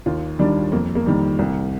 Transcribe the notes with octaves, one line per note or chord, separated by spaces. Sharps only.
D#2 F4
D#3 G3 D4
F2 A#3
A#3
D#3 G3
C2